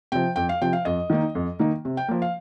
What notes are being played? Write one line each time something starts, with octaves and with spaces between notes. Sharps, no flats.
C3 F3 G5
F2 G5
F5
C3 F3 G5
F5
F2 D#5
D#3 A#3 D#4
F2
D#3 A#3 D#4
C3
G5
F3 A#3
F5